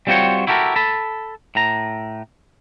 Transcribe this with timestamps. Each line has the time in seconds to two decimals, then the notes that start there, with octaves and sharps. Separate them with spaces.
0.07 G3 C4 F4 F#4 C5 C#5
0.47 E4 F#4 G4 A4 A#4
0.76 A4 A5 B5
1.55 A2 A#5